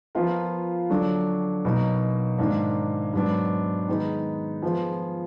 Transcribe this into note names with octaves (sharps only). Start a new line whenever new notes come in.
F3 B3 F4 A#4
D3 F#3 D4 F#4
B2 F#3 A#3 D#4
G#2 D#3 A#3 D4
G#2 F#3 B3 D4
D#3 G#3 B3 D#4
F3 B3 F4 G#4